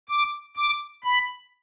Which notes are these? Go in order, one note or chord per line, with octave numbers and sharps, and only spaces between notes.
D6
D6
B5